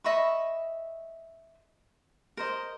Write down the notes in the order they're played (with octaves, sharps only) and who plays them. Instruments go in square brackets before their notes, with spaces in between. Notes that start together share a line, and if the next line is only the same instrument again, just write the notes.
[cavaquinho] D#5 E5 B5 C#6
A#4 C5 D#5